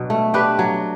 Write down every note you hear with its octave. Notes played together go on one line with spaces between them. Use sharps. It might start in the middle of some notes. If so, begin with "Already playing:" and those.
Already playing: B2 F#3 D4
A3
D4 G4 B4
F#3